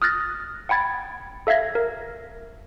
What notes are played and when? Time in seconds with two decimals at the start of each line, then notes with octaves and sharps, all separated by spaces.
0.02 D#6 F6 F#6 A6 A#6
0.69 F#5 G5 B5 G#6 A6
1.47 A4 E5 F5 G#6 A#6
1.75 A#4